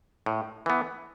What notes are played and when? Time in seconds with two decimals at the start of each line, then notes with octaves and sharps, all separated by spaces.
0.26 A2
0.66 E3 B3